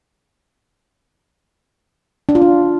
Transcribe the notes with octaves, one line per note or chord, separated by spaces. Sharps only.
D4
F4
D4